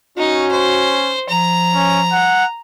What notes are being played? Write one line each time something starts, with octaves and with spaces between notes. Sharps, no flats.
C#4 D#4 F#4
C5
F3 A#5
C#4
F#5